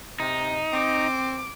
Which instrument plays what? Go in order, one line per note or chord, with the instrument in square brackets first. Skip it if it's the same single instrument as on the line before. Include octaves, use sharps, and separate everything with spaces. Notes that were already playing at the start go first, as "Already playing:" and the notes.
[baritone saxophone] C3 [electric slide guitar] D#4
[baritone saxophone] C4 [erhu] D6